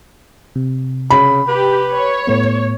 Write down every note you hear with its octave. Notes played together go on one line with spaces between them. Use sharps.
C3
C#3 B5
G4 B4
C#5
A2 A3 B3